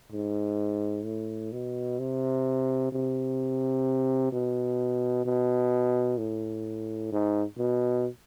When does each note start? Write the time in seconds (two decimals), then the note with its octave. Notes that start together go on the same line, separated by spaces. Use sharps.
0.12 G#2
1.05 A2
1.52 B2
1.99 C3
2.92 C3
4.32 B2
5.25 B2
6.18 A2
7.12 G#2
7.58 B2